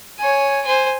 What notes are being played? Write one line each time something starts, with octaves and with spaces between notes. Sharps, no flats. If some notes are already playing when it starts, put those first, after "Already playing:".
C#5 G#5
C5 G#5